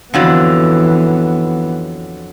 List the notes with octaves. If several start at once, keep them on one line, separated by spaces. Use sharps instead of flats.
F2 D3 E3 F#3 B3